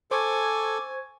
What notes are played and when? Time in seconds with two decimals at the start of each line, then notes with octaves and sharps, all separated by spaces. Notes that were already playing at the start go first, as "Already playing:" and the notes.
0.11 A4 C5 G#5 C#6 D6 G#6